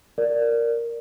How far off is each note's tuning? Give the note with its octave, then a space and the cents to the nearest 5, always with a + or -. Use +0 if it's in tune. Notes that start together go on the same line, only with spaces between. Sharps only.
A#4 +0 D5 +0